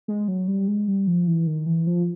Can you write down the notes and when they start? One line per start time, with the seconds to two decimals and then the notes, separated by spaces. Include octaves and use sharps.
0.08 G#3
0.28 F#3
0.48 G3
0.68 G#3
0.88 G3
1.07 F3
1.28 E3
1.47 D#3
1.66 E3
1.87 F3